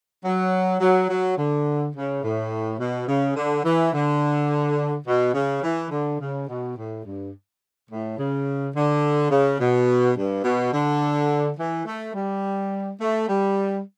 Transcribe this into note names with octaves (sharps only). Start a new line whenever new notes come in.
F#3
F#3
F#3
D3
C#3
A2
B2
C#3
D3
E3
D3
B2
C#3
E3
D3
C#3
B2
A2
G2
A2
C#3
D3
C#3
B2
G2
B2
D3
E3
A3
G3
A3
G3